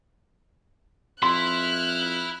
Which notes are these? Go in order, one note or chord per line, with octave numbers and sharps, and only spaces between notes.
F2 E4 E5 C6 F6 F#6